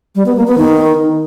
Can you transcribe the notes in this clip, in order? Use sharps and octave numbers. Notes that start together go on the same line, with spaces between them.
G3
B3
A#3
B3
D#3